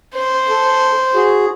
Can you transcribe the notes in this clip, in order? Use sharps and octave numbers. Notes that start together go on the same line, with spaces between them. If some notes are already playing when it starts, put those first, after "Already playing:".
C5
A4
F#4 G#4